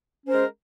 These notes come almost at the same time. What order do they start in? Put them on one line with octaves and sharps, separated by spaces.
C#4 C5 A#4 G#3